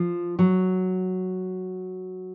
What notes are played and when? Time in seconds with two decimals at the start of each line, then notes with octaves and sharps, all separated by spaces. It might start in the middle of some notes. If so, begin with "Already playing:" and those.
Already playing: F3
0.39 F#3